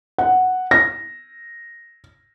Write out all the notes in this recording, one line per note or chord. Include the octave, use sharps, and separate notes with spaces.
F#5
A#6